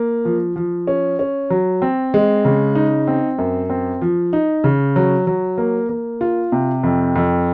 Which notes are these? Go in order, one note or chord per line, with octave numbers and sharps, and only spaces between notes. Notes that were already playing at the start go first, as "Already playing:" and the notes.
Already playing: A#3
F3
F3
C#4
C#4
F#3
C4
G#3
C#3
D#4
C4
F#2
C4
F3
D#4
C#3
F#3
F#3
A#3
A#3
F4
C3
F2
F2